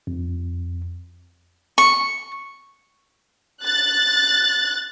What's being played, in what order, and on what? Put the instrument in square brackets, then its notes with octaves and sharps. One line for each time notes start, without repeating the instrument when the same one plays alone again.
[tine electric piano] F2
[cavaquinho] C#6
[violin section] F#6 A6